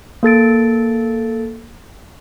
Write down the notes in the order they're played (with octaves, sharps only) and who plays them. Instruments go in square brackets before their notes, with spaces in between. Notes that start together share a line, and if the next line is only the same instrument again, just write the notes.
[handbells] A#3 A4 A6 D7